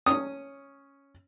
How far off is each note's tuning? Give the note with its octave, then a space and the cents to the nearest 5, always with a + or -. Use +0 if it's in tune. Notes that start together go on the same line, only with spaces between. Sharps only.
C#4 +0 D#6 +0